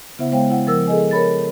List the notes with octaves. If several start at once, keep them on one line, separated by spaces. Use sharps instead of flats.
C#3 B3 E4 C5 E5 F#5
G#3 B3 C5 C#5 F5 G5
E4 F#5
F3 A#4 E6
G#4 A4 D#5 G#5
A#4 C#5 B5 A6